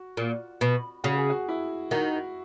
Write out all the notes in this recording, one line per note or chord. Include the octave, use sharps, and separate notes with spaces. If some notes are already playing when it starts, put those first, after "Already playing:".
Already playing: F#4
A#2
B2
C#3 F#4
G#4
F#4
E4
D#3 F#4